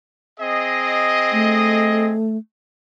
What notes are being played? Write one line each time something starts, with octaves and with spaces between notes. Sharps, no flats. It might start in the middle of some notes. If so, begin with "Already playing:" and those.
C4 G#4 D#5
A3